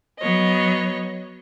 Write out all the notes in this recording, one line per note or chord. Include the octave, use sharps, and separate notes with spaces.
F#3 B3 C#5 D#5